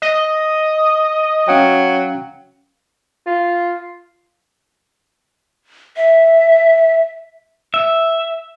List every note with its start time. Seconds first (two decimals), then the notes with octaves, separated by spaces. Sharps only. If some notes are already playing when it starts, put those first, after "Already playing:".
0.02 D#5
1.48 F#3 C#4 F5 G5
3.26 F4
5.96 E5
7.74 E5